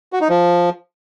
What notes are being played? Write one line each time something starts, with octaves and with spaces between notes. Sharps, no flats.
F#4
D#4
F3